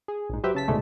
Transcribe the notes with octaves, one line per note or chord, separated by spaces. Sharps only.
G#4
A#1 G#2
F#3 G4 B4 C5 E5
C#3 A5 B6
C2 G#2 B2 D3 G#3 A3